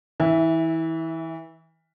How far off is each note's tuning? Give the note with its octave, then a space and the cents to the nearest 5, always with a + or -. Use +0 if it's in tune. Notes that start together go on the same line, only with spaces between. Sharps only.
E3 -25 E5 +0